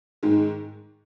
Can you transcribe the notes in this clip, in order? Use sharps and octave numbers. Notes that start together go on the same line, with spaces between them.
G#2 D#3 G#3